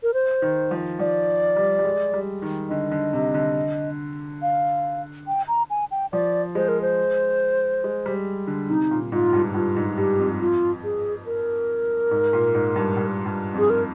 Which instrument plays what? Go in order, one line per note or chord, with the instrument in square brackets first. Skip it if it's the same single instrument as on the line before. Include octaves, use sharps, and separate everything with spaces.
[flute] A#4
C5
[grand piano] D#3
F3
[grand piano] F3 [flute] D5
[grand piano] G3
G3
G#3
G3
D#3
[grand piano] D3 [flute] D#5
[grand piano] D3
C3
D3
[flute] F5
G5
A#5
G#5
G5
[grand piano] F3 [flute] D5
[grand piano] G#3 [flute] C5
[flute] A#4
C5
[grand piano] G#3
G3
D3
[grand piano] C3 [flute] D#4
[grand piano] A#2
[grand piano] G#2 [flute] F4
[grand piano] G2
[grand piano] G2 [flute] F4
[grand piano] G#2
[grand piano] G2 [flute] G4
[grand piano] F2
[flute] F4
G#4
A#4
[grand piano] G#2
A#2
G#2
G2
G2
G2
[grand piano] F2 [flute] G#4
[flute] A#4